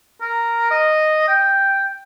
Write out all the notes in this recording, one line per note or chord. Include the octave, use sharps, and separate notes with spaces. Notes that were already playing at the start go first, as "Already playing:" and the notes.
A#4
D#5
G5